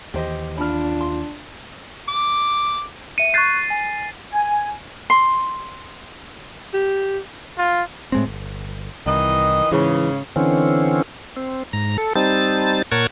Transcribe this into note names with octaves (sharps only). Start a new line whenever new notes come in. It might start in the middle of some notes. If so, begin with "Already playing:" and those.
D#2 E3 G4 C5 D#5
D4 F4 B5 F6
C6
D6
E5 C#7 D#7
C#6 F#6 G6 A6 C7
G#5
G#5
C6
G4
F4
A2 G#3 C4
G1
C2 D#3 E3 D#5
G#2 C#3 E3
D3 E3 C4 C#4
C4
G#2 A#5
A4
G3 C4 D#4 A5 A6
A#2 A#4 C#5 F#5 A5 G#6